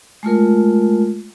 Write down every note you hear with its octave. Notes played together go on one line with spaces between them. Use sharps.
G#3 A3 F4 A#4